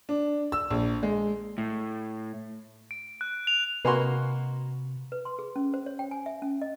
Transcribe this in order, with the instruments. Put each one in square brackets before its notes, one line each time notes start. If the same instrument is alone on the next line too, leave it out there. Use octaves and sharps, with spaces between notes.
[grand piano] D4
E6
A#1
G#3
[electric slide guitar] A2
[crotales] D7
F#6
F7
[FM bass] C3 [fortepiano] A#3 F#4 C6 [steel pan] B4 D#5 G#5
[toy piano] B4
C6
G#4
C#4
C5
C#5
G5
G#5
E5
C#4
D#5